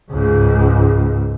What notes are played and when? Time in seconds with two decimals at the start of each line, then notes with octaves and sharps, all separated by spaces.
0.11 C#2 G#2